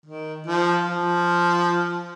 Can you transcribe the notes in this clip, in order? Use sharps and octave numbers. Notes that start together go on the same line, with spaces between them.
D#3
F3
F3